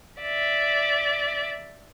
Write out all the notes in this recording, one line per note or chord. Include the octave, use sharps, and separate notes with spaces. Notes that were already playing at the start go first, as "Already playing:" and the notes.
D5 E5